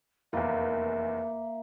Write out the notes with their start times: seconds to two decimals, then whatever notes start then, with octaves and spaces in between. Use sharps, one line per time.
0.33 F1 E2 A#3 E5